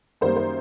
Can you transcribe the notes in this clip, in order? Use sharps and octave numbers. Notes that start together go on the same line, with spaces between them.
F#2 D#3 G3 A#3 C5
C5